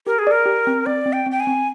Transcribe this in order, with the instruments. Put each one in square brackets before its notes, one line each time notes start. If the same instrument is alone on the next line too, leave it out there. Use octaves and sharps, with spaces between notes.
[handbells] G4 [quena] A#4
[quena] G#4
[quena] A#4 [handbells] D5
[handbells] G4
C4
[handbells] C4 [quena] D5
[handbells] C4
[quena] G5
[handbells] C4 [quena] G5
[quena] G#5
[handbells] C4